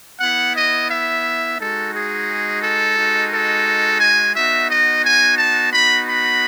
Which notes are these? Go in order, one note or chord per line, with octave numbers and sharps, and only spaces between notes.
B3 E4 F#5
D#5
E5
G#3 D#4 F#4 A4
G#4
A4
G#3 D#4 F#4
A4
G#5
B3 D#4 F#4 E5
D#5
G#5
A5
B3 D#4 F#4 B5
B5